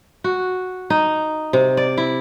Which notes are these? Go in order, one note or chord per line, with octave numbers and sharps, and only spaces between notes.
F#4
D#4
C3
D5
E4